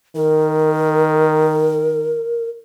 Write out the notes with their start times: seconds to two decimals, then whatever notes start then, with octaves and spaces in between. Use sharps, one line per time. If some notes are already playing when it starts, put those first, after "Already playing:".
0.16 D#3 A#4